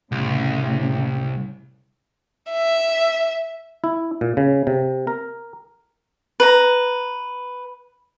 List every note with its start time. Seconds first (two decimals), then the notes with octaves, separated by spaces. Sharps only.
0.12 C2 A2 C#3
2.52 E5
3.84 E4
4.21 A#2
4.37 C#3
4.67 C3
5.07 A#4
6.40 B4 A#5